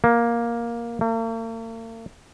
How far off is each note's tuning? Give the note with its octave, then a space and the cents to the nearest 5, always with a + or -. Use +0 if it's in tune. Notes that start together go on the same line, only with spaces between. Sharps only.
A#3 +10
A#3 -45